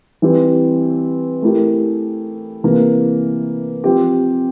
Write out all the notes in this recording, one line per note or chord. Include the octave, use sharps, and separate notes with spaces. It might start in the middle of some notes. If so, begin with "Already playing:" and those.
E3 G3 C4 G4
A3 E4 G4 A#4
C3 E3 A#3
F3 C4 G4